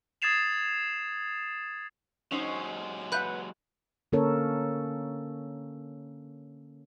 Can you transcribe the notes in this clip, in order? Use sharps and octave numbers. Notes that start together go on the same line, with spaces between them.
D#6 G#6 A6 C7 E7 F7
F#3 G#3 C#4 D#4 C5
B4 E5 F#5 B5 F#6 G6
D3 A#3 C#4 A4 A#4 C#5